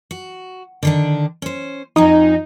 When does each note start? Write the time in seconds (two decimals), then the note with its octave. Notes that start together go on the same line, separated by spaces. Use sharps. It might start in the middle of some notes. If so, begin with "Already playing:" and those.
0.11 F#4
0.83 D3 D#3 D4
1.42 C#4 C5
1.96 F2 F3 D#4 G#5